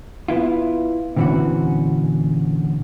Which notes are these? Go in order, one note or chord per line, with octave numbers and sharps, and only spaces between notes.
B3 E4 F4
A#2 D3 E3 C4 C#4 F#4